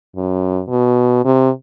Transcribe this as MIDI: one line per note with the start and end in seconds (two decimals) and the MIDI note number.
0.16 0.61 42
0.69 1.23 47
1.25 1.50 48